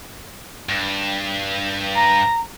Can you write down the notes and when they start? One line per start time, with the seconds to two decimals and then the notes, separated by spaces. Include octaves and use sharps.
0.69 G2
1.95 A#5